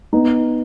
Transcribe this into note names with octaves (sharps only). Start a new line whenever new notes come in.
B3 D#4